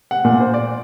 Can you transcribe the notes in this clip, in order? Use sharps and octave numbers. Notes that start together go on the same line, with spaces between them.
F#5
A#2
C5
D5